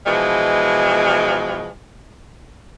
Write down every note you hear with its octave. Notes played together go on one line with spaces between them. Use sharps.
B2 E3 F3 G#3